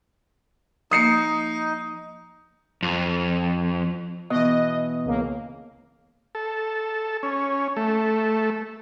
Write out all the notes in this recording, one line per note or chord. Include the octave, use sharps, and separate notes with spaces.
F3 A#3 D#4 D#6 C7 C#7
F2
B2 E3 D#5
C#2 A#3
A4
C#4
A3